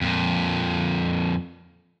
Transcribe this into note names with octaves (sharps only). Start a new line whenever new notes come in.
F2 A#2